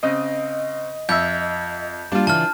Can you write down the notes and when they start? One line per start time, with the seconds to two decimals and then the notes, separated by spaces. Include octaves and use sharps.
0.03 C#3 C4 D#5
1.09 F2 E5 G6
2.12 G3 A#3 D4 F4 A5
2.27 C#3 E3 A5 F6